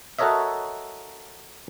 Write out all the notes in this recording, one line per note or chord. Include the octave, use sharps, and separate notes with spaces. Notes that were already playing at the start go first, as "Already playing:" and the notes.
F#4 A4 A#4 C#5 D#5 E5